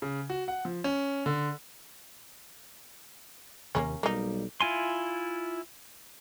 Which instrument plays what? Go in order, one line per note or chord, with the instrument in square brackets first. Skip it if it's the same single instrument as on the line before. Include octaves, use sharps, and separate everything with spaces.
[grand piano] C#3
F#4
F#5
F3
C#4
D3
[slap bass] D#2 C3 [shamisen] A#3 B3 C#4
[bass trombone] B1 [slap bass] G3 [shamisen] A#3 D#4
[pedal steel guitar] E4 F4 G#5 C6